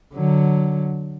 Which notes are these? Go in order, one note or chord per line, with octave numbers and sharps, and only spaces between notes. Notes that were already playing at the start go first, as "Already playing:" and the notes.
D3 F#3